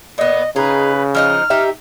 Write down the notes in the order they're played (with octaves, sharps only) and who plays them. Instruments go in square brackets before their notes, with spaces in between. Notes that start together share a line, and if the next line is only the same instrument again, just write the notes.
[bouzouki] A#2 B3 [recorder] D#5
[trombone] C#3 [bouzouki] D#4 G#4 [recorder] B4
[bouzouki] F3 D#4 D#5 [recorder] F6
[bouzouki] D#4 G4 E5